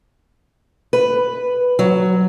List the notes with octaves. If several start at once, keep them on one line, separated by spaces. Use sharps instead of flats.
B4
F#3